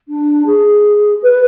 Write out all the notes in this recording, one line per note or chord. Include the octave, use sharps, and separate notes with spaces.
D4
G#4
B4